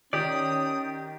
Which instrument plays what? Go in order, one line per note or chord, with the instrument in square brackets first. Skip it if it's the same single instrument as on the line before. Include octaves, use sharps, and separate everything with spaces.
[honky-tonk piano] D#3 [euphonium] C#4 [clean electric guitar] G4 D5 [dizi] D#6